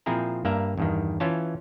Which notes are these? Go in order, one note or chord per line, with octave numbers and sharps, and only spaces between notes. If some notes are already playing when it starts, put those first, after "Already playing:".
A#2 F3 C4 E4 G#4 A#5
G2 A#3 D5 E5 A#5
E2 G2 D#3
E3 C#4 F4 C#5 A5